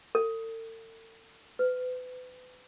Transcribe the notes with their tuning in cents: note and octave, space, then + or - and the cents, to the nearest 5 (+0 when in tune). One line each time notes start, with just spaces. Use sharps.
A4 +40
B4 +35